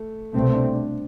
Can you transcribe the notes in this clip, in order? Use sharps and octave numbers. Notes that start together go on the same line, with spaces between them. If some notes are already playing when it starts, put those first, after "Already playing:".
Already playing: A3
C2 B2 A3 C4
D4
D4